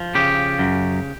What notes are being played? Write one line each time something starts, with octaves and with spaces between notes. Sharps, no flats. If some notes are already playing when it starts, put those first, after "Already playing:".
Already playing: F3
C#3 G4
F#2